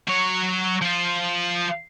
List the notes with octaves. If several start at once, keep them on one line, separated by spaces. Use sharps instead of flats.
F#3 C#5
F3 F4